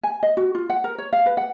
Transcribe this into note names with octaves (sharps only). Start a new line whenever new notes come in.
G#5
D#5
F#4
F4
F#5
A#4
C#5
F5
B4
F#5